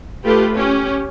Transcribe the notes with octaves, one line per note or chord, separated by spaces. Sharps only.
A3 F4 G4 A4 B4
C#4 G4